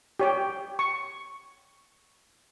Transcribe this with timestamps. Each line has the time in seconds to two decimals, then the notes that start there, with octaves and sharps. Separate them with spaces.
0.20 G4 C#5 G5
0.79 C#6